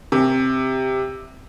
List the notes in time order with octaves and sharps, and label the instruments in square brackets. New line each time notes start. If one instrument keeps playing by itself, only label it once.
[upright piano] C3